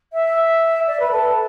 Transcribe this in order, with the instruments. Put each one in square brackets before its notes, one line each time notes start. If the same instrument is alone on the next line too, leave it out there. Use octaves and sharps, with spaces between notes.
[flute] E5
D5
B4
A4